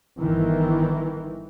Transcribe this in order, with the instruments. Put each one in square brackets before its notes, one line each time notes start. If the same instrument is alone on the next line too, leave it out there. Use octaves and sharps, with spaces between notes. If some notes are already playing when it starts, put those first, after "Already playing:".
[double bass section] G1 D#3 E3